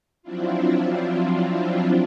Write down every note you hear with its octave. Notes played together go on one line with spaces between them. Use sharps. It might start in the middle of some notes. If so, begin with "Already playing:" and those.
F3 F#3 C4 D4 E4 F4